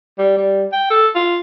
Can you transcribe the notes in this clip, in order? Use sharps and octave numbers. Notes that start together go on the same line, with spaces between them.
G3
G3
G5
A4
F4